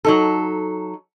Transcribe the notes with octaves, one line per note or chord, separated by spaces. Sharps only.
F#3 D#4 A4